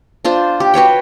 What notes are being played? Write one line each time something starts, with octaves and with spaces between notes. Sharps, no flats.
D4 F4 C5
G4
F#4 B4 C#5 G5